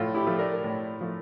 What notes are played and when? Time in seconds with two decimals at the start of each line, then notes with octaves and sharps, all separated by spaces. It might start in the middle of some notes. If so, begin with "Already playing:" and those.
Already playing: A2 F3 F4 A4
0.14 E4 G4
0.27 F3 A3
0.39 A#4 D5
0.64 A2
1.01 F3 A3